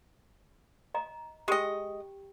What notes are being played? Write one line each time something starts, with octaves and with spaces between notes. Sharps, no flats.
D#5 A#5
G#3 G4 D#5 G5